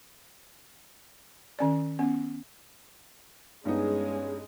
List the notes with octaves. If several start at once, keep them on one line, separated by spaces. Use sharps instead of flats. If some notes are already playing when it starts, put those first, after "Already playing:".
D#3 C#4 D5
B3 C#4
G2 G#3 B3 C#4 D#4 G#4